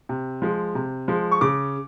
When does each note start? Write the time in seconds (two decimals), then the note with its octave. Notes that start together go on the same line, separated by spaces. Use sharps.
0.09 C3
0.42 F3 G#3
0.75 C3
1.08 F3 G#3
1.32 C#6
1.41 C#3 D6